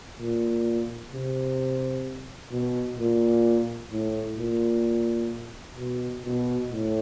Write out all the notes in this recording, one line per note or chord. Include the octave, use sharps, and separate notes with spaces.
A#2
C3
B2
A#2
A2
A#2
B2
B2
A2